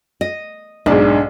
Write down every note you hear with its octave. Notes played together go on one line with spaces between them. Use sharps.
D#5
B1 G#2 D4